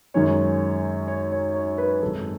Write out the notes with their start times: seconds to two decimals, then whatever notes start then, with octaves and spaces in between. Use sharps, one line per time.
0.14 F#2 D#3 G#3 C#4 C#5
1.08 C#5
1.32 C#5
1.54 C#5
1.78 B4
2.02 G#1 F#2 D#3 G#3 A4